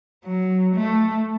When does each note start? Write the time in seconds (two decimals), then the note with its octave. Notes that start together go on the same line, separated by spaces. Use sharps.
0.25 F#3
0.75 A3